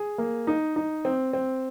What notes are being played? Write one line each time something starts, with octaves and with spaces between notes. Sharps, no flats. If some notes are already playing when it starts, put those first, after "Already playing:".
Already playing: G#4
A#3
D#4
D#4
C4
C4